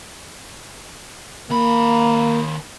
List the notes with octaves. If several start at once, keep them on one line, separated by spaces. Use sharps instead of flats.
D#2 A#3 B5